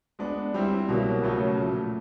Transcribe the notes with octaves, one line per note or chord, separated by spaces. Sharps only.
G#3 B3 D4
G3 C4 E4
C2 B2 F#3 A#3
C#3 F#3 A3 C#4 F#4
A#2 F3 A3